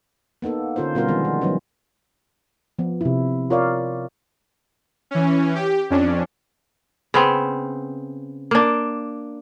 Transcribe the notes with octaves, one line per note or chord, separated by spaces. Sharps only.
A#3 B3 D#4 A4
D3 C#4 F4 A#4 C5
B2 G3 B3 C#4 F4 A#4
D#3 F3 G#3 B3 C4
D#3
E3 F#3 B3 C#4
F3 B3
C3 E4
F4 A#4 C#5 D5 F5
E3 C#4
G4
F2 C#4 D4
C#3 B3 C4
A#3 D4